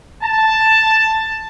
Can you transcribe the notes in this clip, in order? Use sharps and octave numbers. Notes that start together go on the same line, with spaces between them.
A5